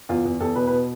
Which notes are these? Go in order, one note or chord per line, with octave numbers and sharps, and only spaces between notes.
E2 F4
E2
E2 A4
B2 B4
B4
B2